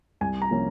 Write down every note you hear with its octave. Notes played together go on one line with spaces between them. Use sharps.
C2 G#5
A#5
C3 F3 A#3 C#4